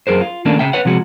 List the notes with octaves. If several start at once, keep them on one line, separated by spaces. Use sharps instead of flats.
F#2 G#4 A#4 C5
F4
D#3 A3 A#3 C#4 D4 A4
C#3 E5 G5
B4 C#5 F#5
C3 F3 G#3 F#4